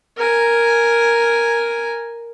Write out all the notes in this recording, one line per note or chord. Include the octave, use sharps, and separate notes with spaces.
A#4 G#5